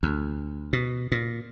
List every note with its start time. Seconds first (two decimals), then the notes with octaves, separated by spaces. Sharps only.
0.03 D2
0.73 B2
1.12 A#2